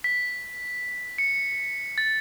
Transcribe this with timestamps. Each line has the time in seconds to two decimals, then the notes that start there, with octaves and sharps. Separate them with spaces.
0.04 B6
1.18 C#7
1.98 A6